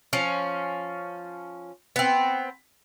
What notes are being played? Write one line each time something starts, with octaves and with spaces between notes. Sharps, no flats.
F3 C#4
B3 C4